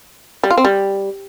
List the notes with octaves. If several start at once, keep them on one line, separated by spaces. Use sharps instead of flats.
G3
F4
C4
G3